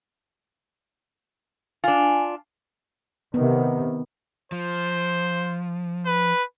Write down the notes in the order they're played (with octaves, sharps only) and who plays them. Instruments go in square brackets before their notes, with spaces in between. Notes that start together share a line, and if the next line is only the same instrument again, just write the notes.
[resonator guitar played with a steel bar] D4 F4 [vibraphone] G#5
[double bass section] C3 D#3 [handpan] B3
[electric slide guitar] F3 [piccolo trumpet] C5
[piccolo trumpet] B4